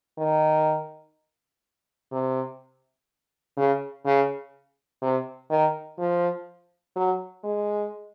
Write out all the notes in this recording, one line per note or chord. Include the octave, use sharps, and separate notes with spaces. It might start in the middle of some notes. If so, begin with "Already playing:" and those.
D#3
C3
C#3
C#3
C3
D#3
F3
F#3
G#3